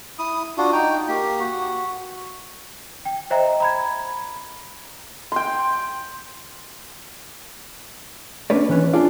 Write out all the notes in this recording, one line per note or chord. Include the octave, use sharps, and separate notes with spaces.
E4 D#6
D4 F4 F#4
D#4 G5
A#3 G4
F#4
G5
C5 D#5 E5 G5 A#5
A#5 B5 G#6
G5 C6
A#3 C#4 D4 B4 C#5 D5
E3 C#4 B4 C#5
D4 F4 G#4 D5 F5